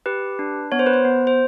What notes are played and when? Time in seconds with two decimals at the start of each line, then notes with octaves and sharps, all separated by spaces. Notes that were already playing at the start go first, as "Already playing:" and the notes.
0.06 G4 B4
0.39 D4
0.72 B3 C#5
0.79 C5
0.86 B4
0.93 C5
1.05 B3
1.27 C5